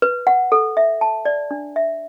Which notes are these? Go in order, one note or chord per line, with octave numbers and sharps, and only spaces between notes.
B4
F#5
A4
E5
A5
D5
D4
E5